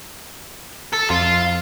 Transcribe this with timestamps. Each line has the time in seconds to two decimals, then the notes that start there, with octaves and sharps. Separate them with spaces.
0.93 A4
1.10 F2 F4